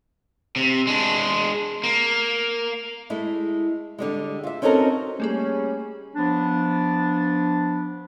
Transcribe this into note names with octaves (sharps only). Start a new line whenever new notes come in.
C3
G#3 D4
A#3
G#3 A3 E4
D3 G3 G#3
F4 E5
C4 C#4 D#4 F#4 A4 A#4
G3 A3 A#3 C#4 G#4
F3 B3 D4